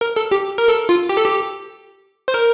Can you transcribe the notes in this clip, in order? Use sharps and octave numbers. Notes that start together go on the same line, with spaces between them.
A#4
A4
G4
A#4
A4
F4
G4
A4
G4
C5
A#4